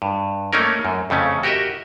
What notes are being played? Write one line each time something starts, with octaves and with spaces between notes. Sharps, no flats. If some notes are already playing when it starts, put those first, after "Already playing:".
G2
A3 A#3 C#4 D#4 A#4
F#2
F2 C#3 A3 C#4
F#4 G4 A#4 D#5 E5